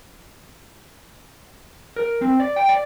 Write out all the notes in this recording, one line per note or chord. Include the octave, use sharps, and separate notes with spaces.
A#4
C4
D5
G5
D5